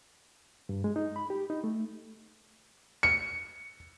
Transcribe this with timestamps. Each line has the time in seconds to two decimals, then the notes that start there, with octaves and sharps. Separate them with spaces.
0.69 G2
0.84 G#3
0.96 D#4
1.16 B5
1.30 G4
1.50 D#4
1.64 A3
3.03 C#7